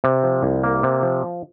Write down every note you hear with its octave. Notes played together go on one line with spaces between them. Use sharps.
C3
F3
C2
A#3
C3
F3